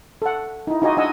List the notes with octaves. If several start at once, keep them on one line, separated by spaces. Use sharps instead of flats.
A4 F#5
D#4 E4
D#4 F4 F#4 D#5 G#5 D6
D4 D#4 D#5 F#5 G#5 E6